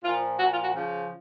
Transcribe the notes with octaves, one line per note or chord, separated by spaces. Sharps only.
A#2 F3 F4
A#2 F3 F#4
F4
F#4
C#3 F3